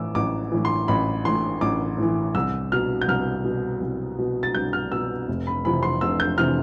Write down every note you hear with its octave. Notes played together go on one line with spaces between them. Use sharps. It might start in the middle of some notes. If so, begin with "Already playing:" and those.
Already playing: A2 E3 D6 E6
A1 D6
A2 E3
C6
A1 B5
A2 E3 C6
A1 D6
A2 E3
C2 E6
B2 F6
G6
C2 F6
B2
C2
B2
A6
C2 G6
F6
B2 E6
F1
B5
F2 C3 E3 B5
C6
F1 E6
G6
C3 E3 F6